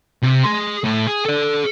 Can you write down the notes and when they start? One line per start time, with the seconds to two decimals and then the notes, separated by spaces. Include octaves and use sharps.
0.22 C3
0.43 G#4 C6
0.84 A2
1.07 G#4 G#5
1.25 A4 D5